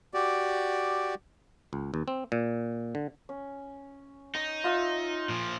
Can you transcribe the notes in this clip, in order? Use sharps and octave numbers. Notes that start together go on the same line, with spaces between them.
F#4 G4 D5
C#2
D#2
C4
A#2
D3
C#4
D#4 C#6
F4 E5 E6
A#2 F3